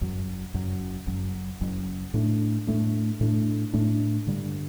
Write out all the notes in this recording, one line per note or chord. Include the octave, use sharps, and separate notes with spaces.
F#1 F#2 F#3
F#1 F#2 F#3
F#1 F#2 F#3
F#1 F#2 F#3
A2 A3 D4
A2 A3 D4
A2 A3 D4
A2 A3 D4
G2 D3 G3